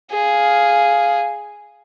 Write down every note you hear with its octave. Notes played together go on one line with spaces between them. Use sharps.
G#4 F5